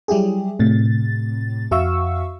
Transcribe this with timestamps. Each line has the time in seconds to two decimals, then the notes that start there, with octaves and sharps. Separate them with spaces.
0.08 F#3 G3 E4 G4 G#4
0.59 A2 C3 A6
1.71 F2 F#4 E5 F5 C#6 E6